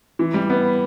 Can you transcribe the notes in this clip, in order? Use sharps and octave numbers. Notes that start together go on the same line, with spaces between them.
E3
G3
B3